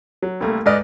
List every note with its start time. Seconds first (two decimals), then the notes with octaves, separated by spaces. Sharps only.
0.22 F#3
0.40 C2 A3 A#3
0.66 G#2 B4 D5 D#5 F6